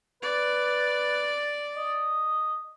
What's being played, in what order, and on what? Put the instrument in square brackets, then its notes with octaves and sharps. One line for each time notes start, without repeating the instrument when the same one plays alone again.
[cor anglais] B4 [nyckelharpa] D5
[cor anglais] D#5